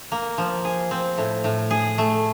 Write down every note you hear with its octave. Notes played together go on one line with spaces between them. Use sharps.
A#3
F3
G#4
C4
A2
A2
G#4
A3